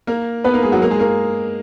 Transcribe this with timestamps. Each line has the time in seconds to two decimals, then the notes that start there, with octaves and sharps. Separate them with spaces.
0.07 A#3 A#4
0.44 B3 B4
0.53 A#3 A#4
0.63 G#3 G#4
0.72 F#3 F#4
0.81 A#3 A#4
0.90 G#3 G#4
1.00 A#3 A#4